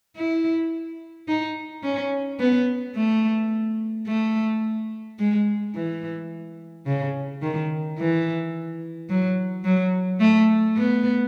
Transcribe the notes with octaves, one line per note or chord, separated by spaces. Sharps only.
E4
D#4
C#4
B3
A3
A3
G#3
E3
C#3
D#3
E3
F#3
F#3
A3
B3